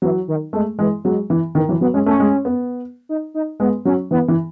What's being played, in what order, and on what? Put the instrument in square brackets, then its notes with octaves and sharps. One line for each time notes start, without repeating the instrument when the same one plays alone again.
[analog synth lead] E3 [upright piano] F#3
[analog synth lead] D#3
[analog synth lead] G#3 [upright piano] A3
[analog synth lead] E3 [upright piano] G#3
[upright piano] F#3 [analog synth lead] G#3
[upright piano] E3
[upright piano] D#3 [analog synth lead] E3
[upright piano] E3 [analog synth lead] F#3
[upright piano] F#3 [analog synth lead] B3
[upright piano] G#3 [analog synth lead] C#4
[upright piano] A3 [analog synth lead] C#4
[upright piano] G#3
B3
[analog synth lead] D#4
D#4
[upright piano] G#3 [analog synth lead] B3
[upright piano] F#3 [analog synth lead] C#4
[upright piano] E3 [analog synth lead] B3
[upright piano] E3